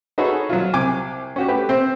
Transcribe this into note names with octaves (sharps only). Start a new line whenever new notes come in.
D#4 F#4 G#4 A4 B4 C#5
F#3 F4
C2 G5 G#5 D6
C#4 F#4 G4
A3 G4 B4
C4 C5